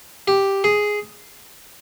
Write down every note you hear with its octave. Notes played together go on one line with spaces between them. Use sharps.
G4
G#4